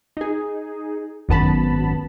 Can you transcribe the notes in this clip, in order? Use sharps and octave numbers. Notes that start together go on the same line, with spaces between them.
D#4 G#4
G#1 F#2 B3 A5 B5